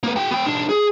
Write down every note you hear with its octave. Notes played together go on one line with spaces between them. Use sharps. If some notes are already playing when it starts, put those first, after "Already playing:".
A#3 B4
F#4 G5
B3 G5
B1 D4
G#4